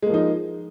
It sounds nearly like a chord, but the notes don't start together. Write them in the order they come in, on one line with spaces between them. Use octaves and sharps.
G#3 A#3 F3 D#4